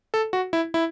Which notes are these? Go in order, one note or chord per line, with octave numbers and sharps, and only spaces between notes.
A4
F#4
E4
E4